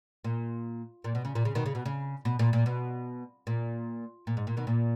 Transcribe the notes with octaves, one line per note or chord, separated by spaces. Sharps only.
A#2
A#2
B2
C#3
A#2
C#3
B2 D#3
C#3
B2
C#3
B2
A#2
A#2
B2
A#2
A#2
G#2
A#2
B2 D#3
A#2